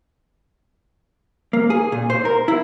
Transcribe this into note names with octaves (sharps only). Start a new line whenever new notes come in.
A#3
G#4
A#2
C5
A#4
E4